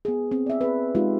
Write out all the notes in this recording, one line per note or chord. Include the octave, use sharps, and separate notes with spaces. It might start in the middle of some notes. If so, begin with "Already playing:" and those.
B3 G#4
C4
D5 E5
G#4 B4
G#3 D#4 F4 G4